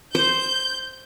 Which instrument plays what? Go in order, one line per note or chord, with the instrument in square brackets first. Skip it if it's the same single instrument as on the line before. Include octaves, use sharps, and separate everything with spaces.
[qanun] C5 [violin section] G6